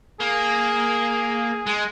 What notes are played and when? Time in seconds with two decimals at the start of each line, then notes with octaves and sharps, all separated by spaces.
0.20 A#3 G#4
1.66 G#3